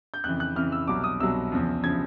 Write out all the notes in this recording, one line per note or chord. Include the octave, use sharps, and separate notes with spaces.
G6
F2 C#3 E3 F#6
F#6
F2 C#3 E3 F6
E6
C2 B2 F#3 D6
D#6
C2 B2 F#3 E6
E2 C#3 F3
C#3 F3 G#6